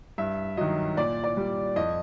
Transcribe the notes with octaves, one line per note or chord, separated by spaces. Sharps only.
G2 E5
D#3 F#3 D#5
A#2 D5
D5
G3
F2 D#5